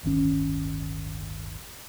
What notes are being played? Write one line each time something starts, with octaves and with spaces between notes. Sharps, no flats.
D1 G1 D#3 C#4